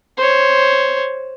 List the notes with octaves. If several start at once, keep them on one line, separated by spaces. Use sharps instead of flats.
C5 C#5